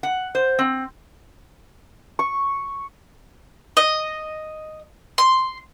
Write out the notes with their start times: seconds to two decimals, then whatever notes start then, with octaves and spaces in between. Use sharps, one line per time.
0.03 F#5
0.35 C5
0.59 C4
2.19 C#6
3.77 D#5
5.18 C6